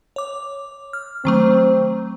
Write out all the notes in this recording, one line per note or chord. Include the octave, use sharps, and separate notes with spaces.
C#5 D6
F6
D#3 F#3 A3 C4